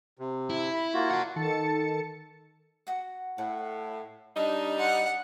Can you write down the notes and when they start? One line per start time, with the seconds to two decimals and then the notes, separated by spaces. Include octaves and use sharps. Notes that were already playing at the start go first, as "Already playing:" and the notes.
0.19 C3
0.50 E4
0.74 B5
0.94 A#3 F4 F#4
1.11 D5 F#5
1.36 D#3 A4 A5 A6 C#7
2.87 F#4 F#5
3.38 A2 F#5
4.37 G3 D4 D#4 D#5
4.79 F#5 C6